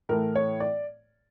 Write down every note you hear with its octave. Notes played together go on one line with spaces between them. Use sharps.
A2 E3 A3 A#4
C#5
D5